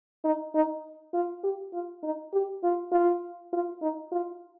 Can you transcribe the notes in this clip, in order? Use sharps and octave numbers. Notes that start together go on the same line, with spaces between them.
D#4
D#4
F4
G4
F4
D#4
G4
F4
F4
F4
D#4
F4